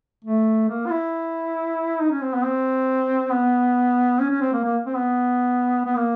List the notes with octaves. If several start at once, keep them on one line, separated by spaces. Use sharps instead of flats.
A3
A#3
F4
E4
D#4
C#4
C4
B3
C4
B3
C#4
C#4
C4
A#3
A#3
C4
B3
B3
A#3